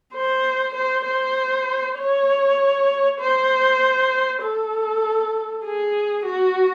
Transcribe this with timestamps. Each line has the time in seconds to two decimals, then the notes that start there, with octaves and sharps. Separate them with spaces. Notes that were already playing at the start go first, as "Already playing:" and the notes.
0.15 C5
0.75 C5
1.05 C5
1.98 C#5
3.20 C5
4.42 A4
5.65 G#4
6.26 F#4